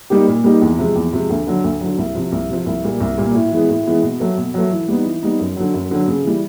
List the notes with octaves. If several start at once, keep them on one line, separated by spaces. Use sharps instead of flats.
G3 A#3 D#4 G4
A#2
G3 A#3 D#4 G4
E2
C3 F3 G#3
E2
C3 F3 G#3
D2
D3 F#3
D2
D3 F#3
C2
C3 F3
C2
C3 F3
C2
A#2 G3 A#3
C2
A#2 G3 A#3
A2
E3 G#3 B3
A2
E3 G#3 B3
B2
F#3 A3
B2
F#3 A3
E3
G3 B3 D#4
E3
G3 B3 D#4
F#2
D3 F#3
F#2
D3 F#3
C#3
E3 G3